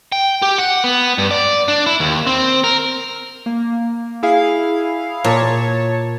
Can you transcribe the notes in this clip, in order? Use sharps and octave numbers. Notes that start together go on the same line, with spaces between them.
G5
G4
F#5
B3
G2
D5
D4
E4
D#2
C4
A#4
A#3
E4 G#4 F5
A#2 C#5 A5